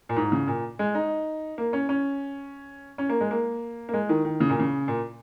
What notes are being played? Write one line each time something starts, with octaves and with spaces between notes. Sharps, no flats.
A#2
G#2
C#3
A#2
G#3
D#4
A#3
C#4
C#4
C#4
A#3
G#3
A#3
A#3
G#3
D#3
D#3
C#3
A#2
C#3
A#2